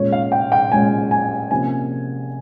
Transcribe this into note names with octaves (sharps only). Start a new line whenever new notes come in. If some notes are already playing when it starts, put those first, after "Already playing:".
Already playing: A#2 G#3 C#4 C#5
F5
G5
G5
A#2 G#3 C#4 G#5
G#5
C3 F3 A#3 C#4 G#5